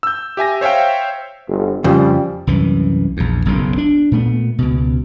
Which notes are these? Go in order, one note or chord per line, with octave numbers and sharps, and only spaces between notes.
E6 G6
G4 E5 G#5 A#6
C5 C#5 E5 F5 G5
G1
F2 C#3 G3
C2 F#2 E3
A#1 E2
F#1 B1 F#2 C#3
D4
A#2 A3 B3
C#2 B2